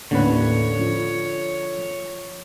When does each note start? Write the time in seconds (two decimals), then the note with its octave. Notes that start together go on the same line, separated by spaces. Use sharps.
0.11 A1 D#2 A2 D3 B4 C#5
0.79 F3